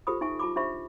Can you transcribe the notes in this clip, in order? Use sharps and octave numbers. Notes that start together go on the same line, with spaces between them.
F4 G4 A4 C5 B5 D#6
D#4 E5 G#5 C#6
F4 A5 B5 D6
D4 G4 C5 E5 B5 C#6